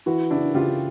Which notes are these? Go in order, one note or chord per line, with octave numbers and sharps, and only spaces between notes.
E3 E4 F#4
C#3 D4 E4
C#3 F4 G4